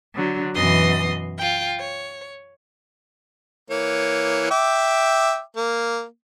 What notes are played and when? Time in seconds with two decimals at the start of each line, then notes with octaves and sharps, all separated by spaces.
0.13 D3 F#3
0.53 F#2 B2 E3 D#5 C6 D#6
1.38 F4 G5
1.79 C#5
3.70 E3 A#3 C#5
4.51 E5 G5 D6
5.57 A#3